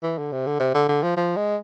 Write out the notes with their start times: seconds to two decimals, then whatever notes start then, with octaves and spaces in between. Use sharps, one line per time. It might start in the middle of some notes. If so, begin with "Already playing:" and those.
0.03 E3
0.18 D3
0.32 C3
0.47 D3
0.60 C3
0.75 D3
0.89 D3
1.03 F3
1.17 F3
1.37 G#3